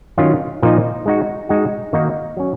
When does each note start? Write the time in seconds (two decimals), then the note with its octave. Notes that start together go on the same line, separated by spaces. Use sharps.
0.18 D#3 F#3 C#4 F4
0.63 A#2 F3 A#3 D#4
1.06 G#3 D#4 F#4
1.49 G#3 D#4 F#4
1.93 D#3 A#3 D#4 F#4
2.37 F#3 C#4